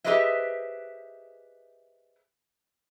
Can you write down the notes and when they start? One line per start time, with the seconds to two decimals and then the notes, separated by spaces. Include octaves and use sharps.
0.04 G4 G#4 B4 C5 D#5 E5